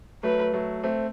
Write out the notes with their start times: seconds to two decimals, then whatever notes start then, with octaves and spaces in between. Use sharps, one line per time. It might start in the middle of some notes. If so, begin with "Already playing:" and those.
0.23 F#3 A3 B4
0.53 F#3 A3
0.83 A3 C4